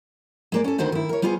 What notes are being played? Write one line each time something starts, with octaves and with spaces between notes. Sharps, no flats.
G#3 A#3 D5
C#4 A4
D2 D3 D#3 F#4 C5 D#5
D#3 E4
A#4 C#5
G3 B3 F4 G#4 C5